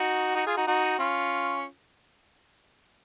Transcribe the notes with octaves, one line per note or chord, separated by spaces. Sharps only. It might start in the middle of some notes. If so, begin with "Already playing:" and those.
Already playing: D#4 F#4
D#4 F#4
F4 G#4
D#4 F#4
D#4 F#4
C#4 F4